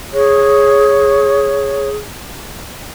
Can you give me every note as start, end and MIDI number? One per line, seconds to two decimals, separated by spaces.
0.13 1.94 68
0.13 1.89 73